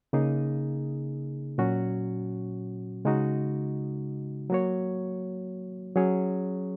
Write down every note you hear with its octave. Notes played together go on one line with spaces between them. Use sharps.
C#3 A#3 D#4 G#4
A#2 F#3 C#4 F#4
C#3 G#3 D#4 F#4
F#3 A#3 F#4 C#5
F#3 C#4 G#4 C#5